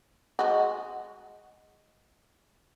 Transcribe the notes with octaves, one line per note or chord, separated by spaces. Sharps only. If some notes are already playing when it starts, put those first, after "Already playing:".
G#3 F#4